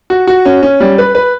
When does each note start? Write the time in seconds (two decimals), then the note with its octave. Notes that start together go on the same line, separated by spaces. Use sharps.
0.10 F#4
0.27 F#4
0.45 C#4
0.63 C#4
0.80 G3
0.98 B4
1.15 B4